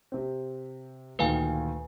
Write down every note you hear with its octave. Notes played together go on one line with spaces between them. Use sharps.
C3 C4
D2 A#2 D#3 B4 F5 G#5